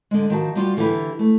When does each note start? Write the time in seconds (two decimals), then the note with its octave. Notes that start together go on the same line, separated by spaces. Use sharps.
0.11 D3 G#3
0.30 D#3 F3 F#4 A5
0.55 G3 F4 F#4
0.77 D3 E3 G4 A4 B4
1.19 A3